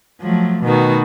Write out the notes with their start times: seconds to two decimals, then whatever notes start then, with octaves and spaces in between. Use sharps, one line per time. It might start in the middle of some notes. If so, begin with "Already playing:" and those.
0.20 F3 F#3 A3
0.63 B2 D#3 A3 D#4 F#4 B4